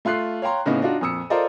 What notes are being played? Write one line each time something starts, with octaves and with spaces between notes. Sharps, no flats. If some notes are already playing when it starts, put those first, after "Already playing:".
A3 F4 C6 F#6 C7
C#5 F5 G5 A#5 C6
A2 C#3 A#3 B3 C#4 D#4
D4 D#4 F4 F#4
F2 A#2 D#6 E6 C#7
F4 A4 A#4 C5 D5 D#5